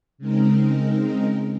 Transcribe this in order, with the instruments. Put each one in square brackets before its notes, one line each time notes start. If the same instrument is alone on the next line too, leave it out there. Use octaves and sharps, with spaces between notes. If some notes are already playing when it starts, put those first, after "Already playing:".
[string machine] C#3 G#3 C4 D#4 A#4